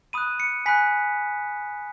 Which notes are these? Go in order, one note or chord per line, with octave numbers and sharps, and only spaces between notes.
B5 D#6 F#6 D#7
C#7
G#5 B5 F#6 B6